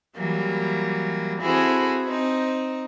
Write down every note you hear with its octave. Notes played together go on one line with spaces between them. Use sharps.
E3 F#3 G3 A#3
C4 E4 F#4 G#4 A4
C4 D#4